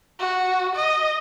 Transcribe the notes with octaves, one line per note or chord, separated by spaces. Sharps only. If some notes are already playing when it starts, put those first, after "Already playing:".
F#4
D#5